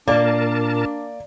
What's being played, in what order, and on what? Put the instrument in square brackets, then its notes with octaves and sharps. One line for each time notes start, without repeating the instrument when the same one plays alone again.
[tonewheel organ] A#2 A#4 A5 [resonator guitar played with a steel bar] A#3 [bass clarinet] D4 [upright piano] D5